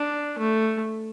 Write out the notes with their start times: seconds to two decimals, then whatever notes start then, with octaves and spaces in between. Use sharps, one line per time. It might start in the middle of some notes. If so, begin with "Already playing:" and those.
Already playing: D4
0.38 A3